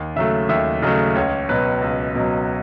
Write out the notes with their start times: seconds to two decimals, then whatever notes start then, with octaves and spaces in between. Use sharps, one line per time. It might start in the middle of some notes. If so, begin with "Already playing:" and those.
Already playing: D#2
0.16 C#3 F#3 A3 E5
0.49 D#2 E5
0.82 C#3 F#3 A3 D#5
1.16 C#2 C#5
1.49 B2 F#3 B4
1.82 C#2
2.15 B2 F#3